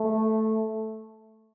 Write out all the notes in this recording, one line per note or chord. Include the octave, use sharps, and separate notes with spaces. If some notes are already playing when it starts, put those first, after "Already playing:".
Already playing: A3